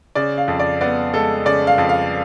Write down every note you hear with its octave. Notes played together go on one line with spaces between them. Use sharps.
C#3 D5
F5
F2
D5
B3 D5
G#3 A4
C#3 D5
F5
F2
F5